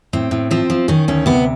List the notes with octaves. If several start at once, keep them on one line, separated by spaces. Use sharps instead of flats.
A2 C4
A2
F3 C4
F3
D#3 C#4
D2 C#4
C3 B3